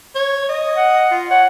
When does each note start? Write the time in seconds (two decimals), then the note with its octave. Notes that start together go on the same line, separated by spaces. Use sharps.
0.15 C#5
0.49 D#5
0.76 F#5
1.11 F4
1.31 C#5 F#5